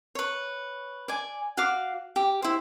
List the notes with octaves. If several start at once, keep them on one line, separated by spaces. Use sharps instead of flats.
B4 C#5
D5 G#5
F#4 F5 D6
G4
E4 C5